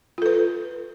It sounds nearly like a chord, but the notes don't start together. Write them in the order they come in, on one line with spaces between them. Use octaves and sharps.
F4 A4 B4